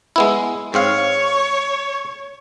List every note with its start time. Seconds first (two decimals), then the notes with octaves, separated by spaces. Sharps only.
0.16 G#3 B3 E4
0.74 G#2 C4 C#5 F5